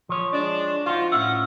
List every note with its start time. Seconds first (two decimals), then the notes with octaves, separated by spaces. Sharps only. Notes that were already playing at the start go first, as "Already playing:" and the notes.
0.09 F3 C#5
0.33 G#3 D4
0.86 D#4 F4 F#4 C5
1.12 A2 C#4 E5 F#5